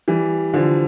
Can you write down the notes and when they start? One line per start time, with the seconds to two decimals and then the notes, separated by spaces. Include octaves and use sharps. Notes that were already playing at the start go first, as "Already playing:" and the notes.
0.08 E3 G3
0.54 D3 F3